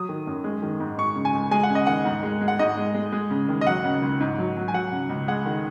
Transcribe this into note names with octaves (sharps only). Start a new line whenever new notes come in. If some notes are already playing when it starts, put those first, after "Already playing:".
Already playing: F#3 D#6
D#3
F#2
G#3
D#3
G#2
G#3 C#6
C#3
G#5
C#2
G#3 G#5
F#5
C#3
D#5
D#2 F#5
G#2
G#3
G#3
F#5
G#2 D#5
G#3
G#3
G#3
C#3
D#2
D#5
F#3 F#5
C#3
C#2
G#2
F#3
F#3
G#5
F#3 F#5
C#3
C#2
G#3 F#5
D#3